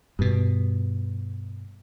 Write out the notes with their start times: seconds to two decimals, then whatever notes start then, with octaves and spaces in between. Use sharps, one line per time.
0.19 G2 B2